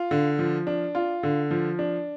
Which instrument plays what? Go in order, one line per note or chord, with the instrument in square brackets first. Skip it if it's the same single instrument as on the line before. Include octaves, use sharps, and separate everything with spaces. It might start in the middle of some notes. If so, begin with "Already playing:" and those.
Already playing: [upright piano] F4
D3
F3
D4
F4
D3
F3
D4